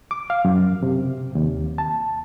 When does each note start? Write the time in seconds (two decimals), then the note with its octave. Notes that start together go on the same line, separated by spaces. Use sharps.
0.11 D6
0.30 F5
0.45 F#2
0.83 C3
1.35 D#2
1.78 A5